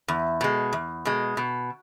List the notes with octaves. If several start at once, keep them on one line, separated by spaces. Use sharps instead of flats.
E2
B2 G#3
E2
B2 G#3
B2